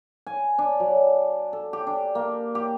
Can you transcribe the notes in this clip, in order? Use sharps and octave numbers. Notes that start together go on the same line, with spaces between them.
G#5
D4
F#3
A4
G4
D4
A#3
G4